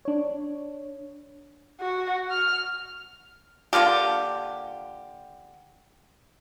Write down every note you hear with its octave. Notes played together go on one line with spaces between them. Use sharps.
D4 C#5
F#4
F6
D3 A#3 F4 G4